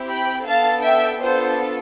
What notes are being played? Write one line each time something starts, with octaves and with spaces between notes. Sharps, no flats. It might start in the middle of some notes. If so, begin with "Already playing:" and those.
Already playing: C4 E4 G4
G5 B5
B3 D4 A4 F5 A5
E5 G5
B3 D4 F4 A4 C5